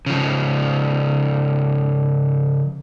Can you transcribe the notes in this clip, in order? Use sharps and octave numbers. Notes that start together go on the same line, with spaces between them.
C#3 F3